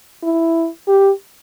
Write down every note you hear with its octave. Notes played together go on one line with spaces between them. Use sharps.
E4
G4